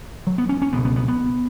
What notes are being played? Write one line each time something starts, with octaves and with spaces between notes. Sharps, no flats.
F#3
B3
C#4
C#4
C#2 B2 B3
B3
B3
B3